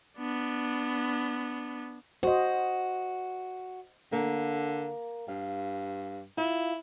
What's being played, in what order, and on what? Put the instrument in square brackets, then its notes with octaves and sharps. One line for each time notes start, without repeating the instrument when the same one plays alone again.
[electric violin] B3 D4
[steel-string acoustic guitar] F#4 [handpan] C5 D#5
[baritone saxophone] D3 [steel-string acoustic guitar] A#3
[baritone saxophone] G2 [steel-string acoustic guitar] F5
[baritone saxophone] E4 [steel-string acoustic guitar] F4